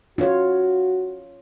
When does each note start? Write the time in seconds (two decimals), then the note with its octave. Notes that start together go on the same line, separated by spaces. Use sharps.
0.18 F4 F#4 C#5